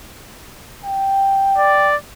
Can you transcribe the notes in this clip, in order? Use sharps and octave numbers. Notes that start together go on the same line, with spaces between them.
G5
D5